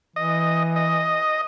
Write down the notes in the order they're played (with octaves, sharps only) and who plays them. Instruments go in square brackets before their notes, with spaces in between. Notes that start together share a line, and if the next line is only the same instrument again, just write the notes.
[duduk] E3 [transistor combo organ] D#5
[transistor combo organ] D#5